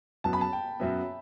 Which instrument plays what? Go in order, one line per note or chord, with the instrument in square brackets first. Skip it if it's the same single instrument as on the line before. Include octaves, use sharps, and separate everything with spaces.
[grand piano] F#2 F#3 B3 [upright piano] A5
[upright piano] B5
A5
G5
[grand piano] F#2 F#3 B3 [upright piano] E5